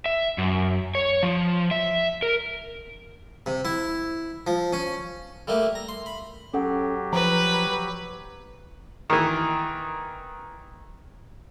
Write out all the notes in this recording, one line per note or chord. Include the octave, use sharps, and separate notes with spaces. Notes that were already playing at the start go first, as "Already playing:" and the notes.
E5
F#2
C#5
F3
E5
A#4
C3
E4
F3
C#4
G3 A3 A#3 G4
A#5
C6
B5
F#3 C#4 G4 A4 F#5
F3 B4 A#5
D#3 E3